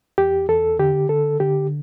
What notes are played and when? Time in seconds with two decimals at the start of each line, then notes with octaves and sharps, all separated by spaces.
0.18 E2 G4
0.49 E2 A4
0.79 D3 G4
1.09 D3 A4
1.40 D3 G4